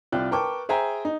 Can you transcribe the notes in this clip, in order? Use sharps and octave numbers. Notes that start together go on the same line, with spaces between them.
C2 F4 D5 G5 F#6
A#4 B4 G5 A5 C#6 D6
G#4 C5 E5 G5 G#5 A#5
D#4